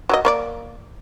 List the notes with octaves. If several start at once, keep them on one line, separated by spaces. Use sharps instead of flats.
F#3 A#3 D#5
A#3 C#5 D5